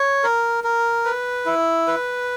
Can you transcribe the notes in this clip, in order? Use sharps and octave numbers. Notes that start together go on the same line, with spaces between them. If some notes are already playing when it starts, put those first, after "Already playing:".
Already playing: C#5
A#4
A#4
B4
E4
B4